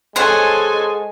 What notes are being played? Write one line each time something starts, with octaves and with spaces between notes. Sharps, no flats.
G#3 A4 C5 C#5 F#5 G#5